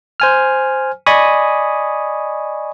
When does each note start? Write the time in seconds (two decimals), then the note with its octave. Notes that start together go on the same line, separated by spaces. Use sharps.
0.20 C5 G#5 F6
1.06 D5 D#5 G#5 B5 C#6 D#6